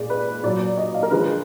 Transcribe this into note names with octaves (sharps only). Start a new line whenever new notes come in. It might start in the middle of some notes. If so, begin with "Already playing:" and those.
Already playing: A#2 G#3 D5
B4
A#2 F#3 D5
D#5
F5
A#4
D3 F3 G#3 B4